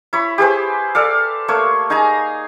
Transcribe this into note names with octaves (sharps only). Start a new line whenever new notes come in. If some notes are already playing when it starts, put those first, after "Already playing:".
E4 C#5 B5
G4 G#4 B4 C5
A4 D5 F5
A3 A#3 C#5
D#4 G#4 G#5 A#5